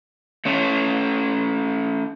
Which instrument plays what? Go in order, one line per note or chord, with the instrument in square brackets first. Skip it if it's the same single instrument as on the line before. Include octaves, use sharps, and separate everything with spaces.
[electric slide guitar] A3 C#4 C#5